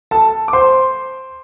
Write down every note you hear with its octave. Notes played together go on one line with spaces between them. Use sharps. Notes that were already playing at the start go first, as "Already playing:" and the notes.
A4 A5
D6
C5 C6